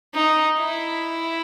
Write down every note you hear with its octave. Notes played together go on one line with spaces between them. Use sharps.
D#4
E4